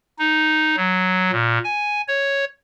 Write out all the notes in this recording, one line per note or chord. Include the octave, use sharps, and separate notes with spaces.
D#4
F#3
A#2
G#5
C#5